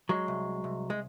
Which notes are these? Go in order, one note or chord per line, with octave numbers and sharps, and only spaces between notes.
F#3 G#3
C2
C2
G#3